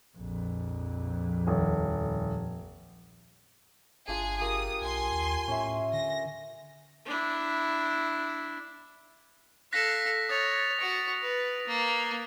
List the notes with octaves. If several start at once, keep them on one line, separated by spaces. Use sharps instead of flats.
A#1 F2
D#1
G1 D4 F4 G#4 G#5
F4 G4 A#4 D#6
B1 G#5 C6
D#2
A2 C#4 E5
D3 A#6
D4 E4
A4 F5 F#6 A#6 B6
C#5 D#6 A6 F7
F#4 C#6 D7
B4
A#3